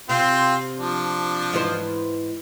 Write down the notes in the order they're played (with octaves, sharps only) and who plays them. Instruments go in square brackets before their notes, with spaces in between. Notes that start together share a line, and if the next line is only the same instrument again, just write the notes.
[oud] C3 [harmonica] C4 F4
[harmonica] F3 D4
[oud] G#2 E3 C5